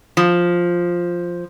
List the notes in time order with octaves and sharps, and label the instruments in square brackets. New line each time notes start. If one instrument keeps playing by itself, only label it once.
[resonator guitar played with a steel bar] F3